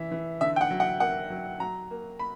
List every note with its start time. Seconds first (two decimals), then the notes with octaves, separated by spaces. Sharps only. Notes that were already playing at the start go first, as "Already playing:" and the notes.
Already playing: E3 E5
0.11 E3
0.41 D3 E5
0.56 G5
0.61 F#5
0.71 F#3
0.80 F#5
1.00 A#3 F#5
1.30 F#3
1.60 F#3 A#5
1.91 A#3
2.19 B5